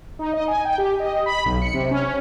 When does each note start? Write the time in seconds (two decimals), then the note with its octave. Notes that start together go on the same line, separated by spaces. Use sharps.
0.19 D#4
0.33 D#5
0.48 G#5
0.65 G5
0.78 G4
1.00 D#5
1.26 B5
1.45 B1
1.62 C#7
1.74 C3
1.91 C#4